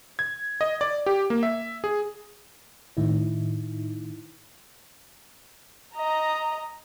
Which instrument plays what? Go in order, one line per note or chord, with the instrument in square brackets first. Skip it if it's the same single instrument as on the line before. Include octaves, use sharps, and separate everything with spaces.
[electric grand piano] G#6
D#5
D5
G4
A#3
E5
G#4
[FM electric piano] A2 D#3 D#4 E4
[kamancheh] D#5 A#5